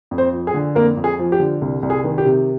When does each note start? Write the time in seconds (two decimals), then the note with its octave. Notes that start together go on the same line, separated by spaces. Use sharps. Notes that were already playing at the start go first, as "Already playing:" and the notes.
0.11 F2
0.18 C4 C5
0.33 F3
0.47 G#4
0.54 D3
0.75 F2 A#3 A#4
0.97 F2
1.04 G#4
1.19 F3
1.32 G4
1.40 D3
1.62 C2
1.83 C2
1.90 G#4
2.04 D#3
2.18 G4
2.26 C3